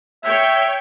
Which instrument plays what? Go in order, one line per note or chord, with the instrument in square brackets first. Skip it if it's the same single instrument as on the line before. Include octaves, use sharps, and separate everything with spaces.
[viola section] C#5 G5 [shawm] E5